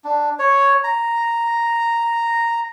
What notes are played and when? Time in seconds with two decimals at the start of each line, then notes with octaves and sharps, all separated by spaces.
0.04 D4
0.39 C#5
0.84 A#5